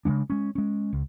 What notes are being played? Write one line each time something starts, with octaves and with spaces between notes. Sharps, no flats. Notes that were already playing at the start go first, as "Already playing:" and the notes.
C#3 E3 G#3 D4
G#3 C#4
G#3 C#4
C#2